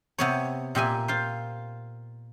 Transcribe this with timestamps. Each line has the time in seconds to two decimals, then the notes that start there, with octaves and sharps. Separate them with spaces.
0.18 C3 B3 C#5
0.75 A#2 G4 E5 G#5
1.08 F4 C5